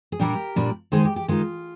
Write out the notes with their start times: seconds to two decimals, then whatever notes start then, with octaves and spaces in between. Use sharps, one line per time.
0.12 G#4
0.20 A#2 G3 D4 G4 A#4
0.56 A#2 G3 D4
0.92 D#3 G#3 D#4 G#4 C5
1.05 G4
1.16 G4
1.28 D#3 G#3 D#4 F4